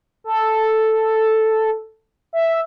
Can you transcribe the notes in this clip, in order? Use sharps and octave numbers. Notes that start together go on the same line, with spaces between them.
A4
E5